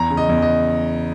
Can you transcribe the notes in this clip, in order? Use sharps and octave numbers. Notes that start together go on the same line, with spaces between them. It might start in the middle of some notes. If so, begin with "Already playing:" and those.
Already playing: E2 A#5
C#3
D#5
E2
D#5